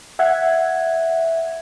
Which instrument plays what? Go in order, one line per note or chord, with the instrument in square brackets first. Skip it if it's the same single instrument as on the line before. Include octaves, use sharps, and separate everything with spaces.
[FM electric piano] E5 F#5 G#6